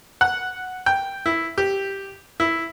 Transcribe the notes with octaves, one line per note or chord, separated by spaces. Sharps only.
F#5
G5
E4
G4
E4